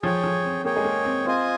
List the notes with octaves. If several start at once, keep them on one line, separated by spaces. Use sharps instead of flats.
F3 G#4 C#5 G5
F3
C4
A#3 G#4 C#5 G5
G#3
A#3
C4
C4 F4 C5 D#5 G#5